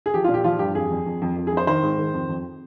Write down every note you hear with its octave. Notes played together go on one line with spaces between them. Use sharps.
G#4
F3 G4
F4
A#2
G4
F3 F4
G2 G4
F2 G#4
F2
F2
F2
F2
G#4
F2 C5
D#3 C5
G#2
D#3
F2
F2